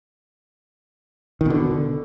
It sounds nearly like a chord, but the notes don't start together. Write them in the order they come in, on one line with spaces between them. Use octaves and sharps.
D#3 B2 D3